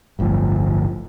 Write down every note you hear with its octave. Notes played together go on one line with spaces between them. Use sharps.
D1 G1 D2 F3